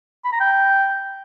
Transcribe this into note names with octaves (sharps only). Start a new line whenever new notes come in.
B5
A#5
G5